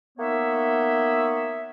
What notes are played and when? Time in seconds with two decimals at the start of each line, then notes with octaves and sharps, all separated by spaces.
0.18 A#3 B3 D#4 C#5 E5